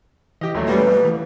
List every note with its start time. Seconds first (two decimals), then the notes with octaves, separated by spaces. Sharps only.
0.41 E3 G4 D#5
0.54 D#2 A#2 F#3 A3
0.68 B2 G3 A3 C#4 B4
0.87 F2
1.05 E3